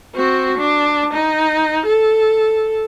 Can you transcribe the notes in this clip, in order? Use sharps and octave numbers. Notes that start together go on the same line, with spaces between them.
C4 F#4
D4
D#4
A4